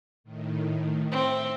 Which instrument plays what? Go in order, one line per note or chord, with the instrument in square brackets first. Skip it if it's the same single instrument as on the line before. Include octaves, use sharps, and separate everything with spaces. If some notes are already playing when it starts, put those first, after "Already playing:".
[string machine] A2 D#3
[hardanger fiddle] C4 [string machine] E5